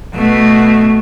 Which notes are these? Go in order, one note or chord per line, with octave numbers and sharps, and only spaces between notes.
B2 A3